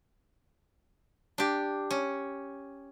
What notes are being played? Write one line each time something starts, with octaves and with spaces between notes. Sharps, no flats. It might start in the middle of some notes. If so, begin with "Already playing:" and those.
D4 G4
C#4